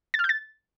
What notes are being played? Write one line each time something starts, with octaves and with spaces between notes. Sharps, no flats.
A6
F6
G6
A6